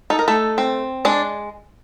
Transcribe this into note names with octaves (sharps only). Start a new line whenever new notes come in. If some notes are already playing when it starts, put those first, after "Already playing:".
D#4 A4
A#4
A3 A4
C4
G#3 D4 D5